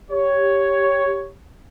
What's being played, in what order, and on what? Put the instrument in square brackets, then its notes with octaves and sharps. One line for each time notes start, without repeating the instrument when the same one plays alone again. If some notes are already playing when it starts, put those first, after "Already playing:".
[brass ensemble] G4 C#5